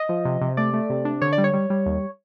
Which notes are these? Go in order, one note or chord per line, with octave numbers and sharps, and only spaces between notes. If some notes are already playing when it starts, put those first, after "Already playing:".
Already playing: D#5
F3
C3
C3
A3 D5
A3
C3
D4
D3 C#5
D5
G3
C#5
G3
G3
D#2